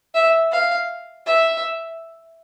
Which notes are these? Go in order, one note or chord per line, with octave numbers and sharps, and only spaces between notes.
E5
F5
E5